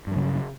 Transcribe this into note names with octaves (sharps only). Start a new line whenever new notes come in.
G2 C#3 F#3